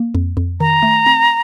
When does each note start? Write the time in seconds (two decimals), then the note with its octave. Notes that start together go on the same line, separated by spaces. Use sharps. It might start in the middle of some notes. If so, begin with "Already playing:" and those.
Already playing: A#3
0.15 F2
0.37 F2
0.60 D#3 A#5
0.83 A3
1.06 C4